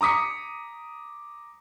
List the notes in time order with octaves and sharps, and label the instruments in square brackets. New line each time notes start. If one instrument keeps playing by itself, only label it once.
[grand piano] A#5 D6 D#6 B6 C#7